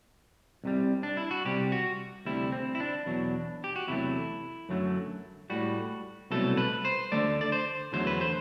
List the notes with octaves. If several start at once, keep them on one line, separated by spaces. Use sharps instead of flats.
C2 C3 G3
D4
E4
F#4
C2 C3 G3 G4
F#4
D2 C3 G3 E4
C4
E4
D4
E2 B2 F#3
G4
F#4
E2 C3 F#3 A3 E4
F#2 D3 F#3 A3
A2 G3 F#4
C2 B2 F#3 A3 A4
B4
C5
D2 D3 F#3 A3 D5
D5
C5
E2 D3 F#3 A3 C5
B4
C5